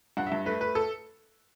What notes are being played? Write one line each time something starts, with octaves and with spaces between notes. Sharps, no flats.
G2 F#5
E5
G2
A3 B4
A3 B4
A4